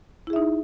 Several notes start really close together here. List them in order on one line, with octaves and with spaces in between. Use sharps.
E4 G#4 E5 D#4